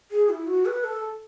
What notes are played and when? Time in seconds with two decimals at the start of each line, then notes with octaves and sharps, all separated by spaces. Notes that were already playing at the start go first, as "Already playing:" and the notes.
0.11 G#4
0.29 E4
0.47 F#4
0.66 B4
0.84 A4